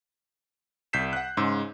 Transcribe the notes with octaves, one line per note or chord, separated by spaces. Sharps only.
C2 G6 B6 C7 E7
F#5 F#6
G#2 C#3 C6 E6